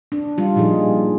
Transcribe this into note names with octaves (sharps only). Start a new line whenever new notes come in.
D4
G3 F4
A#2 F3 D#4 G#4